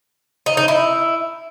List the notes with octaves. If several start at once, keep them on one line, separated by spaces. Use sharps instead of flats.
D#4
D#4
E4